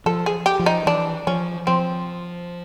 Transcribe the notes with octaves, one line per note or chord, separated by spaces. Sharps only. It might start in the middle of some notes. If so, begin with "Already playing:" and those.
F3 A4
G#4
G4
F3
D#4
E3 D4
F3 C#4
F3 C4